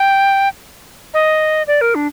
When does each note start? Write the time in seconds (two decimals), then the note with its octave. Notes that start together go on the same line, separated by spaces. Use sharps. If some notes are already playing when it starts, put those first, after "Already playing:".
Already playing: G5
1.14 D#5
1.67 D5
1.81 A#4
1.95 D4